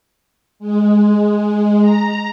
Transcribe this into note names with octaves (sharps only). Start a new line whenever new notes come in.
G#3
G#3
A#5